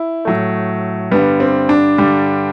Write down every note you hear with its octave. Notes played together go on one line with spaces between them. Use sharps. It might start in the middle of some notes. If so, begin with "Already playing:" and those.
Already playing: E4
A2 F#3 A3
G2 D3 G3 B3
C4
D4
G2 D3 G3